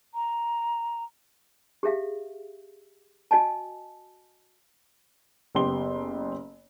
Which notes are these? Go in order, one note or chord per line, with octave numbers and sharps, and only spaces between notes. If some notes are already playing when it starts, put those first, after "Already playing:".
A#5
G4 G#4 E5 F5
F#4 D#5 G#5 A5
F#1 B3 G4 C6 G7